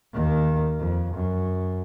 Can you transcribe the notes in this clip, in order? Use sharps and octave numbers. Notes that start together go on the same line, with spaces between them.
D#2 D#3
F2
F#2